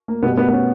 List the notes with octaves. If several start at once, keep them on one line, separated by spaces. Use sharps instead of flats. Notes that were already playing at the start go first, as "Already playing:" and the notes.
A#3
B2 G3 B3
B3
B3
C#4